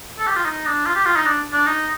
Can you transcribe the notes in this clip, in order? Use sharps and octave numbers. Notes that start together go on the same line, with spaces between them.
A4
G4
F4
D#4
D4
F4
G4
F4
D#4
D4
D4
D#4